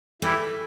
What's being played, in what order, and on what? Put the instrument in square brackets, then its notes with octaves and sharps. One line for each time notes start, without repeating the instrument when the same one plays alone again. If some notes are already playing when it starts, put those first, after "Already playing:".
[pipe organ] E3 G3 E4 [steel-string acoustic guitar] A3